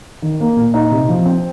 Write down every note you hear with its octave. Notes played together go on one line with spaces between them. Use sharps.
D#3
A#3
A#2
D#4
C3
F3
C4